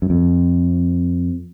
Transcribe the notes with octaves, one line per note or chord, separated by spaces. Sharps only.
F#2
F2